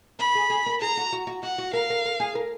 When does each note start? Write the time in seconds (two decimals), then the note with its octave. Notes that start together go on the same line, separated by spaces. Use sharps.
0.19 A#4 B5
0.35 G#4
0.50 G#4
0.66 A#4
0.81 G#4 A#5
0.97 F#4
1.13 F#4
1.27 F#4
1.43 F#4 F#5
1.58 F#4
1.73 A#4 F5
1.90 A#4
2.05 A#4
2.20 G#4
2.35 A#4